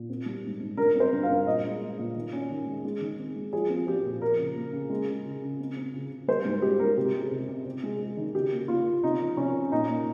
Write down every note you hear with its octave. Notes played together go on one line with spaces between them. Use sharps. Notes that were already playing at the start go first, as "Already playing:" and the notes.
Already playing: A#2
C4
G3
G#2
G#2
G2 A#4
C4
C5
G2
F5
G2
A#2 D#5
G#3
G#3
A#2
D#3
C#4
D#3
G#3
G#3
D#3
C4
G#3
F3 G#4
C4
F3 G4
A#2
F3 A#4
C#3
A#3
C#3
G#3
C#3
C#3
C#3
C4
C4
C#3
C#3
G3 C5
G#2
G#2 G4
G#2 A#4
C3 G4
G#3
C3
C3
C3
G#3
G#3
D#3
C#3 G4
A#3
A#3 F4
C#3
C3 D#4
F3
C3 C#4
C3
A#2 D#4
A#3